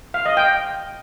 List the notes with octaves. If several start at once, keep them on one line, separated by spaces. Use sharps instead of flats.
F5
D#5
G5